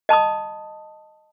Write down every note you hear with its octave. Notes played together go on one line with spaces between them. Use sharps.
D#5 A5 B5 D#6